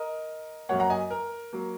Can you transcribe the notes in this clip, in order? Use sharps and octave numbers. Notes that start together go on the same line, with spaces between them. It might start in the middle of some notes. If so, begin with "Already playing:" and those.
Already playing: A#4 D#5
F#2 F#3 A#3 C#5 F#5
F#5 A#5
D#5 G#5
A#4
F#3 A#3